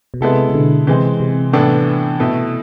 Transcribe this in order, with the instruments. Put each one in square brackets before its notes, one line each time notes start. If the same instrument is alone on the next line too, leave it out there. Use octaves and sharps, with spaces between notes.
[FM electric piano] B2
[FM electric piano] C3 [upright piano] G#3 B3 E4 A4
[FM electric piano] C3
B2 D3
[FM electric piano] C3 [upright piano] E3 G#3 C4
[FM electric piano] C3
[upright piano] A2 E3 B3 D4 A4
B2 A3 E4 A4